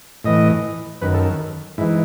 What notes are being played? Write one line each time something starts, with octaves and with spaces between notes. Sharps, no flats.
A2 E3 D#5
F#2 D#3 B4
A4
G#2 E3 E4